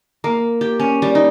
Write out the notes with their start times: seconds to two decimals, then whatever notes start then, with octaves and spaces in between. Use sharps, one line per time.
0.24 A#3
0.61 G4
0.80 C#4
1.02 G3
1.15 D#4